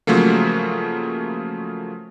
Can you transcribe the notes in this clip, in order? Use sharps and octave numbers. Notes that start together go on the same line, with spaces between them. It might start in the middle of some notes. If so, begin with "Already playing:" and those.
C#3 F3 F#3 A3 A#3